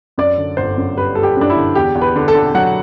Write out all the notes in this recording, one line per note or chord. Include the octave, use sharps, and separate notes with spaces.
F#2 D5
D3
G1 C5
F#2
G3 B4
G3 A4
G4
F#2 D4
E4
D3
E2 G4
E2
B4
D3
A4
D3
F#3 F#5